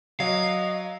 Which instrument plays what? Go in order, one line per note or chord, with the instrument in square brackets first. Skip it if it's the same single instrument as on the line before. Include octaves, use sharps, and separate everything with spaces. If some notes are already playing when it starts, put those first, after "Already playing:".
[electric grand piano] F#3 [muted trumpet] D#5 [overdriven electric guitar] F5